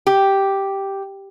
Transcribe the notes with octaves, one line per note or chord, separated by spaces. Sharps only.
G4